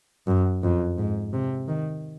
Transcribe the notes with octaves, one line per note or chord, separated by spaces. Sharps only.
F#2
F2
G#2
C3
D#3